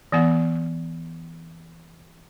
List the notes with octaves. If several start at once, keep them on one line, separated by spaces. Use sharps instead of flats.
E3 B3 F#5